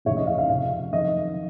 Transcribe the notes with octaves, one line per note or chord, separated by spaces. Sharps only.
F1 D#2 C#3 C#5
D#5
F5
F5
F1 F2 C#3 F5
F#1 F2 D#3 D#5